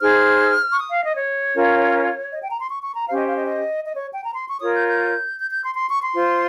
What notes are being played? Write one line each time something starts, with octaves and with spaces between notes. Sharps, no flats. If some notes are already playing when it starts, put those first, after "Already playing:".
D#4 G#4 C5 F6
C#6
D#6
F5
D#5
C#5
C#4 F4 A#4
D#5
G5
A#5
C6
C#6
C#6
A#5
C#4 G4 C5 F5
D#5
F5
D#5
D#5
D#5
C#5
G5
A#5
C6
C#6
F4 A#4 C#5 D#6
G6
G6
G6
G6
C6
C6
C#6
C6
F4 C5